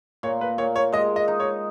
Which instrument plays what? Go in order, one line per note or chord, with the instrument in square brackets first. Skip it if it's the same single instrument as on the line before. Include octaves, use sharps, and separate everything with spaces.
[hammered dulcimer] A#2 [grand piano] C#5
[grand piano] B4
[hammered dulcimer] A#2 [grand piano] C#5
[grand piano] C#5
[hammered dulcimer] G#3 [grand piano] D#5
[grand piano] D#5
[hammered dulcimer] D#4
[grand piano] C#5